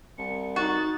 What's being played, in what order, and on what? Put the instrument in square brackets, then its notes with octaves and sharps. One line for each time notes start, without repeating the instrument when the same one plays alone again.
[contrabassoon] C2 [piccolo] C#7
[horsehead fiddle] D#4 [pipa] F#4 [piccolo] A6